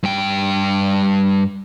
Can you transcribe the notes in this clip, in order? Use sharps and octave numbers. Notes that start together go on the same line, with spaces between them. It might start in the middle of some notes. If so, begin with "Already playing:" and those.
G2 G5